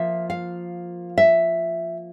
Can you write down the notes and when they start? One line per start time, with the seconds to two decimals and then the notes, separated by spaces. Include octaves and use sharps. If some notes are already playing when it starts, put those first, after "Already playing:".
Already playing: F3 A#3 F4 E5
0.30 F5
1.18 E5